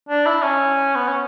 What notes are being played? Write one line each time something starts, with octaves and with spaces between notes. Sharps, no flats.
D4
E4
C#4
B3
C#4